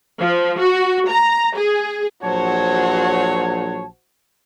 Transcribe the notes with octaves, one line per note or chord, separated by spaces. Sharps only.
F3
F#4
A#5
G#4
A#1 F#3 F#4 C5 C#5 A5